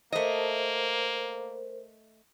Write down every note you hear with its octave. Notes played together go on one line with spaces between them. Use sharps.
A3 A#3 A#4 C5 D#5